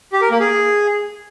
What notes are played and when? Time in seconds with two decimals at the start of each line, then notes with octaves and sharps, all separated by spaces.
0.13 G4
0.22 A#4
0.31 A#3
0.40 G#4